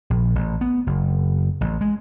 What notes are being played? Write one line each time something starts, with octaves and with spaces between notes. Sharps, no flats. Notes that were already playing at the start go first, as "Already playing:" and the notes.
A#1
A1
B3
F#1
A1
G#3